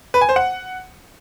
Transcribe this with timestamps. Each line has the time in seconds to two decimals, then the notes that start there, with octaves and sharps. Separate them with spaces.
0.14 B4
0.21 G#5
0.29 C5
0.36 F#5